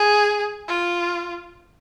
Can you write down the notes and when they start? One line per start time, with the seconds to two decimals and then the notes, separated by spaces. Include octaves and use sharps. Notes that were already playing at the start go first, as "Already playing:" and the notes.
Already playing: G#4
0.68 F4